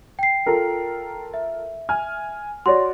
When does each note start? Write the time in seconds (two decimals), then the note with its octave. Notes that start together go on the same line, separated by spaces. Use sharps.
0.19 G5 C7
0.46 F4 A4 A#4
1.34 E5
1.89 G#5 F6
2.66 F#4 C#5 D5 C6